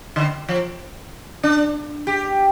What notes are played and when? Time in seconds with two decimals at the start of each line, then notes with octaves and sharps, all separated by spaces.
0.16 D3
0.49 F3
1.43 D4
2.07 G4